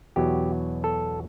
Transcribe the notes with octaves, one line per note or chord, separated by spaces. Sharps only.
E2 B2 F#3 G4
A4